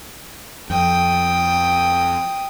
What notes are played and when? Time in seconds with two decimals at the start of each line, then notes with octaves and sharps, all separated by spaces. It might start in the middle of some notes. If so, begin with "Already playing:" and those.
0.70 F2 G5 D#6